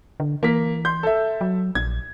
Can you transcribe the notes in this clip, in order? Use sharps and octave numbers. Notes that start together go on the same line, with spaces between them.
D3
E3 A#3 B6
C6 G6
A4 E5
F#3
A#1 G#6